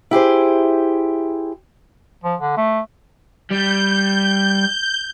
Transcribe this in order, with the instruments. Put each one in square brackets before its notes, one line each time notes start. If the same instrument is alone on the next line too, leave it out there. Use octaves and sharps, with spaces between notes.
[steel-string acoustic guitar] E4 G4 G#4 C5
[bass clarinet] F3
D3
A3
[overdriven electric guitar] G3 [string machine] G6